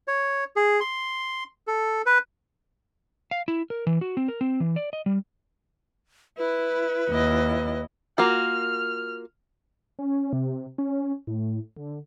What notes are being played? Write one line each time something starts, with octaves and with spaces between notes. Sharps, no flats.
C#5
G#4
C6
A4
B4
F5
E4
A#4
E3
F#4
C4
A#4
C4
E3
D5
D#5
G3
E4 B4
D#2 E4 D#5
A#3 F4 F#4 F6
C#4
C3
C#4
A2
D3